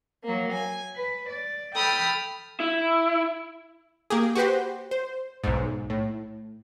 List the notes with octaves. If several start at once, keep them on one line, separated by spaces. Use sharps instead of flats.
F#3 A#3
G#5
B4
D5
A4 G5 B5 D#6 F6
E4
A#3 G4 G#4
F#4 G4 B4 C5
C5
B1 G#2
A2